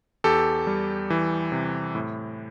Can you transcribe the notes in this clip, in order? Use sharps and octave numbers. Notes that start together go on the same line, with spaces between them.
E2 G4 A4
G3
E3
C3
A2